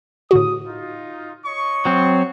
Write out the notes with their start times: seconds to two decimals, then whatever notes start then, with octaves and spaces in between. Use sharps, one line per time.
0.31 A2 D3 F#4 D#6
0.65 D#4 F4
1.46 C#5 D#5 C#6
1.85 F#3 C4